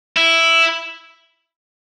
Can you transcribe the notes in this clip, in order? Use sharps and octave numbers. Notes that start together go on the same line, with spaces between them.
E4